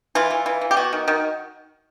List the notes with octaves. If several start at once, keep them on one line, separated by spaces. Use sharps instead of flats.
E3 F4
E3
E3
E3
G4
B3 F#4
D#3
D#3